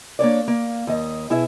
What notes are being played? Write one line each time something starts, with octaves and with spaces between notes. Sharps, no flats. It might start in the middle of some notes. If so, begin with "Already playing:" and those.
A#3 D4 C#5 D5
A#3
D#2 D#5
B2 E4 G#4 E5